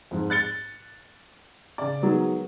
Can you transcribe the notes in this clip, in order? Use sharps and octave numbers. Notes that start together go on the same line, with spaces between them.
F2 G#2
F#6 A6 C#7 G7
C#3 D5
D#3 F#3 G#3 B3